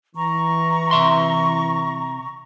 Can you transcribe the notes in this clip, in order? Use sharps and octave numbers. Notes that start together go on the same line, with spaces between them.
E3 A#5 C#6
C3 E5 C6